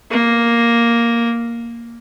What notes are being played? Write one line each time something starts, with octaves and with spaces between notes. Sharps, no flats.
A#3